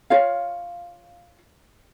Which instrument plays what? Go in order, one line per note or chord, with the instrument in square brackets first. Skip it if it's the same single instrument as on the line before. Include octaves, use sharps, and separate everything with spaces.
[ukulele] F4 C#5 F5